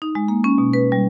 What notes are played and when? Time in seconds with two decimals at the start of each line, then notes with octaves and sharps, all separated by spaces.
0.02 D#4
0.15 G#3
0.28 A#3
0.44 C#4
0.58 B2
0.73 B4
0.92 G3